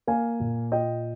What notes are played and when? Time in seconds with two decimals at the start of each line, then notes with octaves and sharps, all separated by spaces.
0.07 A#3 F5 G#5
0.40 A#2
0.72 F4 D#5 G5